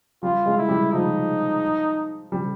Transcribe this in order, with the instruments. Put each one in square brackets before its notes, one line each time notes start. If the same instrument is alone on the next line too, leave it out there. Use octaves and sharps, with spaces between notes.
[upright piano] G3 [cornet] F4
[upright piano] G#3
[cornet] E4
[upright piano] G3
[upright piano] F3 [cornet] D#4
[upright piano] G3